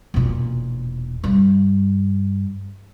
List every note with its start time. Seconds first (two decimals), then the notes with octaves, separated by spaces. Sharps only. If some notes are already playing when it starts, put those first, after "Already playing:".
0.14 E1 A#2
1.24 G2